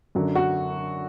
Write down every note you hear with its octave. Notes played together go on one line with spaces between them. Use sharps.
F#2 D3 F#3
F#4